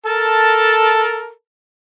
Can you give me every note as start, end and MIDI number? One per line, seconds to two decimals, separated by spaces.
0.06 1.31 69
0.06 1.31 70
0.06 1.31 81